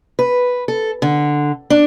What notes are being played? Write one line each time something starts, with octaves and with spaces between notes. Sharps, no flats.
B4
A4
D3
D4